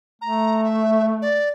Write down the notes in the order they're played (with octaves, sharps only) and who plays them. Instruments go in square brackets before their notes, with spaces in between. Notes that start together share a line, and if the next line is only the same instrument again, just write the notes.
[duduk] A3 [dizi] A#5
[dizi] E5
D5